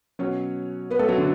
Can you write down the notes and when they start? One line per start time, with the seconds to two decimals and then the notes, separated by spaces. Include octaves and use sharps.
0.19 B2 F#3 C#4 C#5
0.90 B3 B4
0.99 A3 A4
1.08 F#3 F#4
1.18 D3 D4